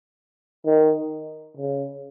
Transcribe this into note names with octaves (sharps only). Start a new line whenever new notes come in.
D#3
C#3